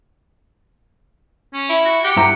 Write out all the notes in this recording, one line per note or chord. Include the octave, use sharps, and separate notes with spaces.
C#4
E4
F#4
G4 F#5
G2 E4 A#5